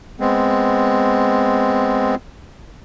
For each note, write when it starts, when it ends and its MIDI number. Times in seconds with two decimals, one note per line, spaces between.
0.20 2.15 56
0.20 2.15 59
0.20 2.15 60